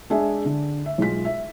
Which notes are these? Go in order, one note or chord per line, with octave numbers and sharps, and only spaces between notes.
G#3 D4 G#4 E5 G#5
D3
E5
B1 G#3 F4 B6
E5